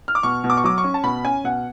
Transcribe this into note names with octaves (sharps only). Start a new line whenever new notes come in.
F6
D6
B2 C#6
B2
D6
C#6
F#3 D6
C#6
C#4
A5
B2 B5
C#4 G#5
B2 F#5